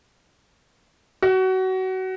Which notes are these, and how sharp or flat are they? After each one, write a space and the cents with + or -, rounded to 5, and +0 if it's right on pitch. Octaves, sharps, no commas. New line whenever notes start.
F#4 +25